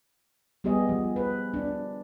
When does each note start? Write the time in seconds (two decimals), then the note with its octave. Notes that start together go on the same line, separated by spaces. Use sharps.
0.64 G3 B3 G4 G#4 D#5
0.89 F3
1.16 B4
1.54 D4